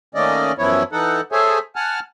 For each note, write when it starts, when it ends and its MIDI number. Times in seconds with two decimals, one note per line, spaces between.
0.15 0.52 51
0.15 0.52 57
0.15 0.52 58
0.15 0.52 61
0.15 0.52 74
0.15 0.52 75
0.59 0.83 42
0.59 0.83 52
0.59 0.83 53
0.59 0.83 59
0.59 0.83 64
0.59 0.83 73
0.92 1.21 52
0.92 1.21 63
0.92 1.21 69
0.92 1.21 78
1.32 1.59 68
1.32 1.59 69
1.32 1.59 72
1.32 1.59 73
1.32 1.59 76
1.32 1.59 80
1.76 2.00 78
1.76 2.00 80
1.76 2.00 81
1.76 2.00 89